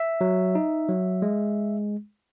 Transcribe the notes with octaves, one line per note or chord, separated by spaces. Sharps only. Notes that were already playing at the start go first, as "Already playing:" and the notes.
Already playing: E5
F#3
D#4
F#3
G#3